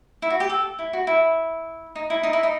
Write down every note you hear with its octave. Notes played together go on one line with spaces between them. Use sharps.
E4
F#4
G4
A4
E4
F#4
E4
D#4
E4
D#4
E4
D#4